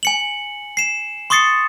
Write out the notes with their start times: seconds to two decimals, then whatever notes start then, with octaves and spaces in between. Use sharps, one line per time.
0.03 G#5 C#7 F#7
0.77 C7 E7
1.30 C6 C#6 D#6 A6 C7 C#7